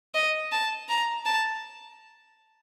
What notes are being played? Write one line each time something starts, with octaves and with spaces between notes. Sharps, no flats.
D#5
A5
A#5
A5